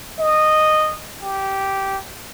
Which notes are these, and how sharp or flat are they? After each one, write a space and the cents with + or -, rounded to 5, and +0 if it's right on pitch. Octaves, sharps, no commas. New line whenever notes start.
D#5 -10
G4 -10